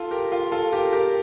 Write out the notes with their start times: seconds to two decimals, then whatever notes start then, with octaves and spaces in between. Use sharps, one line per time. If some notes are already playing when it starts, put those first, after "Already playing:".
Already playing: F4 A4
0.11 G4 A#4
0.32 F4
0.52 F4 A4
0.72 G4 A#4
0.93 G4 A#4